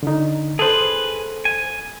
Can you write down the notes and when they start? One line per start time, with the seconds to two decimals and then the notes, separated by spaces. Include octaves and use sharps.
0.03 D3 D#4
0.59 G#4 A4 B4 C5
1.45 G#5